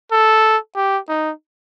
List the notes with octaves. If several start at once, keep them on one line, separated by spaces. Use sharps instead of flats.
A4
G4
D#4